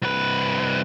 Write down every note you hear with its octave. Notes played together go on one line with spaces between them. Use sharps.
C2 B4